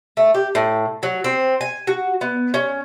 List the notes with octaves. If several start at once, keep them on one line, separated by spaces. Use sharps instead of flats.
A3
G4
A2
F#3
C4
G#5
F#4
B3
C#4